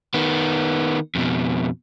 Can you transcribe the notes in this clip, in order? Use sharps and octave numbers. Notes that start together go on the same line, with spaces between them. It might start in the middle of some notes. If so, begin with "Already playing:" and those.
D#3 B3
F2 B2